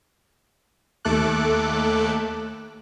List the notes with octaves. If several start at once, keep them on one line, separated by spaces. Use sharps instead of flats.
D#2 A3 A4 D6 F#6